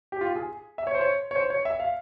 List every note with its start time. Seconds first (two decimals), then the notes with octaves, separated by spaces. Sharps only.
0.12 G4
0.21 F4
0.36 G#4
0.78 E5
0.87 C#5
0.95 C5
1.01 C#5
1.31 C#5
1.36 C5
1.50 C#5
1.65 E5
1.80 F5